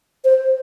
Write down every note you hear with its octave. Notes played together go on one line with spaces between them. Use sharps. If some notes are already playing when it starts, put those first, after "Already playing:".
C5